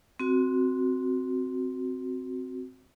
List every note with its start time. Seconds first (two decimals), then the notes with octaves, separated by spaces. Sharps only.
0.20 C4 F#4